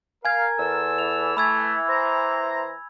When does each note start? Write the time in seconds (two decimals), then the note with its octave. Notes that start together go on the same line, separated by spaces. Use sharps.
0.25 A#4 F5 G#5 G#6
0.59 E2 A4 E6
0.99 E3 E4 F7
1.37 A3 B5 E6 G#6
1.89 C5 A#5